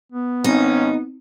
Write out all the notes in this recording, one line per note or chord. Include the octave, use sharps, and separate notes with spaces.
B3
G#1 C4 C#4 D#4